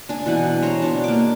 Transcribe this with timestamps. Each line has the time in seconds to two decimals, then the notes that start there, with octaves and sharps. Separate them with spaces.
0.09 D4 G#5
0.26 B2 E3 F#5 G#5
0.62 C5 C#5 A#5
0.82 B2 D4
1.04 A#3 D6